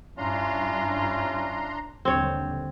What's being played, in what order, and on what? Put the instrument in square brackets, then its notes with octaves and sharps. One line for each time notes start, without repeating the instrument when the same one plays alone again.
[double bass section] G2 [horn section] C#4 E4 F4 [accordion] D4 A#5 C6
[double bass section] D#2 D3 G3 [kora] C4 C#5